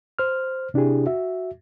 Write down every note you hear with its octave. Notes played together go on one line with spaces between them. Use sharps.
C5 F6
C3 D4 E4 G4 G#4
F#4 E5